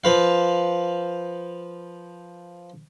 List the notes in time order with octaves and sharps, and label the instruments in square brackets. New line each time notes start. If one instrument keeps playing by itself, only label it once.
[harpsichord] F3 B4 F5